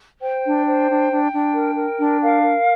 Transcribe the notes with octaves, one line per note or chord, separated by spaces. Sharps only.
C5 G5
D4
C5
D4
D4
D4
A#4
A#4
D4
A#4 F5
A#4